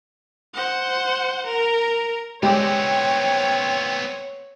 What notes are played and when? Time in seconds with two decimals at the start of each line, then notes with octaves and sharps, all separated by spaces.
0.54 C5 F#5
1.46 A#4
2.43 G#3 B3 C4 G4 C#5 G5